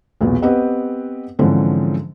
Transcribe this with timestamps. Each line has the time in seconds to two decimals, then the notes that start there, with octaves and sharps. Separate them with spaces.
0.21 B1 E2 A#2
0.42 B3 C4 G4 B4 D#5 F#5
1.39 G#2 D3 E3 F3 C4 C#4